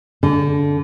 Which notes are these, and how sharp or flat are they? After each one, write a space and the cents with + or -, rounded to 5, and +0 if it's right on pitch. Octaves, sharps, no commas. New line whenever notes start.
D3 -25